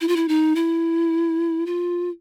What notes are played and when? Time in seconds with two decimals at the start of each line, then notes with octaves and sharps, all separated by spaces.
0.01 E4
0.08 F4
0.16 E4
0.28 D#4
0.55 E4
1.66 F4